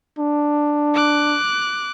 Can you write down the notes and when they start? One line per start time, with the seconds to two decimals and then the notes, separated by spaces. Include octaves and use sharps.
0.19 D4
0.94 D6 F#6